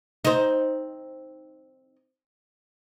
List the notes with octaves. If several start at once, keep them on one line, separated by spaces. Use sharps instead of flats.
C4 D#4